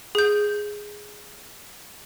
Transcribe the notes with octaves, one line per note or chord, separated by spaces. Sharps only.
G#4 G6